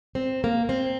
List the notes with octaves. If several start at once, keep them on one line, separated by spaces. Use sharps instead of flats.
C4
A#3
C4